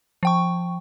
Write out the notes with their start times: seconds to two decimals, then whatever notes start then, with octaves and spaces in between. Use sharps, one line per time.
0.23 F3 G5 C#6